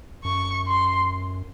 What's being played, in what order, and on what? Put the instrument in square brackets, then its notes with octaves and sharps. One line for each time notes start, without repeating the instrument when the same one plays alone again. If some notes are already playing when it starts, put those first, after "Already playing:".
[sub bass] F#2 [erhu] C#6
[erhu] C6